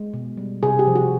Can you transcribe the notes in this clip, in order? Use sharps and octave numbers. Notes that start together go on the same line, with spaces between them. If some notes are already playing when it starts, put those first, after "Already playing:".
Already playing: G#3
B2
G3
C3 G#4
G4
F3
F#4